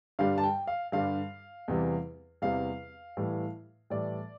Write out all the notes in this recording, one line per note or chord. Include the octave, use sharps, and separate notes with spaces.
G2 D3 G3 F5
A5
G5
F5
G2 D3 G3 F5
E2 C3 E3 G3
E2 C3 E3 G3 F5
A2 E3 G3
A2 E3 G3 D5